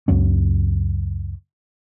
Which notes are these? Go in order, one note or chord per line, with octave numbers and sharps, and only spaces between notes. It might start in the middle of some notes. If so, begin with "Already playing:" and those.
C#2 F#2 F#3 C#4